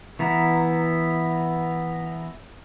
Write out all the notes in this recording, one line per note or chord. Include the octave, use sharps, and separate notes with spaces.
E3 B3 A#5